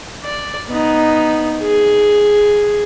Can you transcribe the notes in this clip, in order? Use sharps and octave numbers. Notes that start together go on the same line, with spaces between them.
D5
B3 D#4
G#4